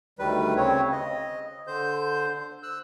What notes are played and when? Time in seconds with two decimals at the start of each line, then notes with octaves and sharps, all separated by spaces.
0.19 D2 D#3 G3 B4
0.57 C#3 C4 C#5
0.92 D#5
1.67 D3 C5 G6
2.63 E6 F#6